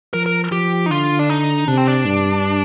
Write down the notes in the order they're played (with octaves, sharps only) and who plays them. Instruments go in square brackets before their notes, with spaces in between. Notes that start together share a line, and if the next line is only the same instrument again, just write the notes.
[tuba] F3 [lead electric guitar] A#4
[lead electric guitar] A#4
[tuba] F3 [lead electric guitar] G4
[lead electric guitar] D#4
[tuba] D3 [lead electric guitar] F4
[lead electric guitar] D4
D#4
[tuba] C3 [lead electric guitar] D4
[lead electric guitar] C4
D4
[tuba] G2